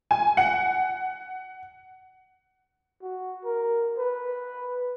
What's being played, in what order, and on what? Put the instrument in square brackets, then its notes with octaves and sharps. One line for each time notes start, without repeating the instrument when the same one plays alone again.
[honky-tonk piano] G#5
F#5
[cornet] F#4
A#4
B4